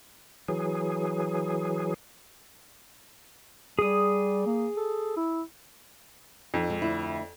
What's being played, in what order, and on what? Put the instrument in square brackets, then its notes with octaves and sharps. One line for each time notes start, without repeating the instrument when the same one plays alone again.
[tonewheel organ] E3 F#3 G#4
[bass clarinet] G3 [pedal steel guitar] G#4 D#6
[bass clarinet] A#3
A4
E4
[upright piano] F2 [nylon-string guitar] D#4
[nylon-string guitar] G#3
D2 E4